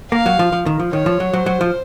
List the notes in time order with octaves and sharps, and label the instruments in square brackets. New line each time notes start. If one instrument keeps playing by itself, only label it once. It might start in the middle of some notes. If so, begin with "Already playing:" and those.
[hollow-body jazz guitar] A#3 [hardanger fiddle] F5
[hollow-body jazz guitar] F#3
F3
F3
D#3
F3
[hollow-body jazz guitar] D#3 [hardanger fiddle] C#5
[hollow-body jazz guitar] F3
F#3
[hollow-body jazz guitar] F#3 [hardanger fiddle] C5
[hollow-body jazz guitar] F#3
F3